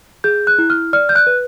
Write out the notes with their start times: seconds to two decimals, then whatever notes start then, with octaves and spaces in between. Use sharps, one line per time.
0.24 G#4 G6
0.47 F#6
0.58 E4
0.70 F6
0.93 D5 F6
1.09 G6
1.15 F#6
1.27 B4